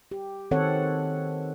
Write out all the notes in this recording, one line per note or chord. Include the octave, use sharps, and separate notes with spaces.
G4
D#3 C4 A4 C#5 F#5